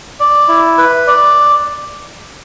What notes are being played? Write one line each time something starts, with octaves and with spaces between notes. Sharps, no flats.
D5
E4
B4
D5